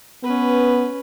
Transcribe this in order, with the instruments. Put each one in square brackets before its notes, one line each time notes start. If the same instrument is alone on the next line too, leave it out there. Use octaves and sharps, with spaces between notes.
[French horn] B3 [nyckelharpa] C#4 B4